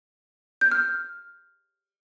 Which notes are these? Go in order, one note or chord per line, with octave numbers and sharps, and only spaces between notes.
G6
F6